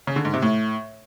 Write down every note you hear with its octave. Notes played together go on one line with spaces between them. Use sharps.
C#3
D3
G#2
C3
A2